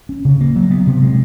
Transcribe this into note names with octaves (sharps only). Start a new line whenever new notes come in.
C#4
C#3
A#3
F#3
B3
C3
G#3